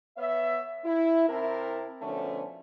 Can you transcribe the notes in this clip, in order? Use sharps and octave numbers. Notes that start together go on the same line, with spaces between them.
B3 C#5 E5
E4
C3 C4 E4 A#4 A5
B2 D3 F3 A3 C#4